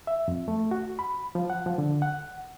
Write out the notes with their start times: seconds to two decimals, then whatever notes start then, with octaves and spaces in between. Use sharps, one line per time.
0.07 E5
0.28 F2
0.48 A3
0.71 F#4
0.99 B5
1.35 F3
1.50 F#5
1.66 F3
1.78 D3
2.02 F#5